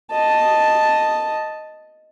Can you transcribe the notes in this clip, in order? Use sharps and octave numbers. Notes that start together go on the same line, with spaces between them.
D#5 A5